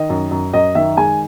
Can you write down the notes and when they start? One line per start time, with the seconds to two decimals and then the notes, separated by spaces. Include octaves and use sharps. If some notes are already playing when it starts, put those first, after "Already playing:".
Already playing: D#3 D#5
0.10 F#2
0.31 F#2
0.53 F#2 D#5
0.75 D#3 E5
0.97 G#3 G#5